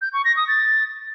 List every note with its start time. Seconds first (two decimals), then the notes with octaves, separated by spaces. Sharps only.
0.02 G6
0.13 C#6
0.25 A#6
0.36 D#6
0.48 A6